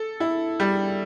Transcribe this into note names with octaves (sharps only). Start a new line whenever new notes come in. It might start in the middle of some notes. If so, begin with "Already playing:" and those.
Already playing: A4
E4
G3